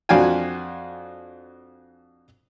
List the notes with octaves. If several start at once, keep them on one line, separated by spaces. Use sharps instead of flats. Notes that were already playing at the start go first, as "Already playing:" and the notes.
F2 D4 F#4 F5 G5 G#5